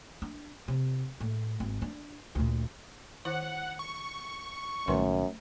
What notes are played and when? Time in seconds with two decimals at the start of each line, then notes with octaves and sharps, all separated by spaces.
0.22 D4
0.68 C3
1.20 A2
1.60 G#1
1.82 D4
2.35 D2 A#2
3.25 D#3 E4 C5 F#5
3.79 C#6
4.88 C2 F#2 A#2 D#3 A3 B4 C6